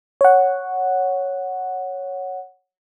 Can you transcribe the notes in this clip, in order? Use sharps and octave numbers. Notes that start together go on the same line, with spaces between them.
C#5 F#5